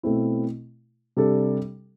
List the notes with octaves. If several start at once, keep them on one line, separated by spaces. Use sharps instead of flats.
B2 A3 C4 E4
C3 G3 D4 A4